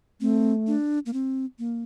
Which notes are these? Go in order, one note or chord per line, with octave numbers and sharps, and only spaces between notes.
A3 C4
D4
A#3
C4
A#3